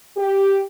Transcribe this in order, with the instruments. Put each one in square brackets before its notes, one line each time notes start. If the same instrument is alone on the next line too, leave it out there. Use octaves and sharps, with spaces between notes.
[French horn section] G4